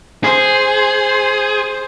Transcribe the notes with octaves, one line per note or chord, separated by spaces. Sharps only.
G#4 C5